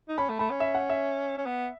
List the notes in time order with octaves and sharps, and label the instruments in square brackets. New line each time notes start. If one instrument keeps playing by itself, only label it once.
[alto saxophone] D#4
[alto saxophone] C#4 [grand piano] B5
[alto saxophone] A3
[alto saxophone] A3 [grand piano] B5
[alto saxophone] C#4
[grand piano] E5
F#5
E5
[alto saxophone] C#4
B3